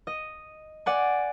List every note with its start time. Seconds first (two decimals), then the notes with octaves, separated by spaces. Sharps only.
0.07 D#5
0.86 D5 F#5 G#5